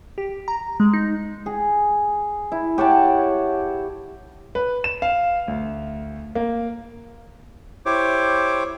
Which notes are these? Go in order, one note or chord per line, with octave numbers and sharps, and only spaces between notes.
G4
A#5
G#3
D#4
G#4
E4
G4 C#5 F#5 A5
B4
E7
F5
D2
A#3
E4 G4 C5 C#5 D6